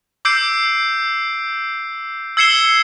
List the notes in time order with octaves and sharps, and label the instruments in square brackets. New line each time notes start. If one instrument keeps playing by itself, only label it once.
[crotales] D6 E6 G6 C7 D7
E6 G#6 C7 C#7 E7 G7